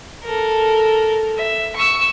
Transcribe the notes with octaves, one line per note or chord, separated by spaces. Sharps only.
A4 A#4
E5
C#6 E6